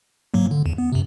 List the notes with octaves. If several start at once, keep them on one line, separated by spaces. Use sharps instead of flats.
G#2 F#3 A#3
D3
E2
B3
F#2 C3